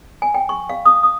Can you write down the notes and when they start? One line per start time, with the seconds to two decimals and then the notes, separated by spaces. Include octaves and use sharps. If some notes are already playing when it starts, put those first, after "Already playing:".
0.22 G#5
0.34 G5
0.49 C#6
0.69 F5
0.85 D#6
1.03 D#6